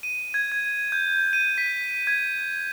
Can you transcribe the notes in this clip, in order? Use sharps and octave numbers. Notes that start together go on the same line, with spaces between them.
D#7
G#6
G#6
G6
D#7
B6
G#6